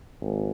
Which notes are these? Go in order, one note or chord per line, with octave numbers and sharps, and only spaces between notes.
G#1